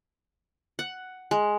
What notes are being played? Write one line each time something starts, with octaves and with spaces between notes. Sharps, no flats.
F#5
G#3